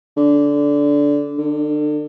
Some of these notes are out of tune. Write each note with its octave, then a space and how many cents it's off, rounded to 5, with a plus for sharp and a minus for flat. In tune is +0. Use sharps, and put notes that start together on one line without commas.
D3 -15
D3 +35